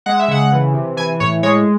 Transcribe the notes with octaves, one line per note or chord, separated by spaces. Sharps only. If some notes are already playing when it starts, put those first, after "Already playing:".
G#3 F#5
E5
C#3 F#5
E3
C3
E3 G#5
A2 C#5
G#3 C#5